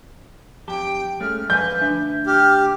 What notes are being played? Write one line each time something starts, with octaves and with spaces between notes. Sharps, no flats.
F2 G4 G5 A5
G#3 A3 C#4 F6
F3 B4 E5 G#5 G6
D2 D4 E5
G4 F6